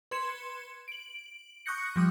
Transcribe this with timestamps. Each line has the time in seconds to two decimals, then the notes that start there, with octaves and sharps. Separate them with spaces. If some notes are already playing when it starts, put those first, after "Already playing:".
0.11 B4 C6 G#6 C#7 E7
0.88 D7 F#7
1.66 C#6 D#6 F#6 G6 A#6 C#7
1.96 F3 G3 D#6